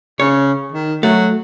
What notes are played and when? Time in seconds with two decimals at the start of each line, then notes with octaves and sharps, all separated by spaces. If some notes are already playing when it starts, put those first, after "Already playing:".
0.20 C#3 C#5
0.72 D#3
1.03 F#3 A3